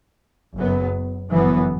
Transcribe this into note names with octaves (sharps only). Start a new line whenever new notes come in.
F#1 F#2 F#3 B3
G1 F#2 E3 B3